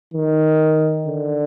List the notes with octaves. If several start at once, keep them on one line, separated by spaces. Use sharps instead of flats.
D#3
D3